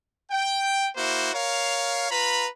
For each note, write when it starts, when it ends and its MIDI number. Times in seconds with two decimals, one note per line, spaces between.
0.31 0.87 79
0.96 1.32 58
0.96 1.32 64
0.96 1.32 66
0.96 1.32 72
1.34 2.10 70
1.34 2.10 73
1.34 2.10 77
2.11 2.47 65
2.11 2.47 71
2.11 2.47 82
2.11 2.47 83